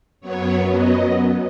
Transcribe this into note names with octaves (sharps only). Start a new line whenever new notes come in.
F#2 F#3 B3 C#5
D#5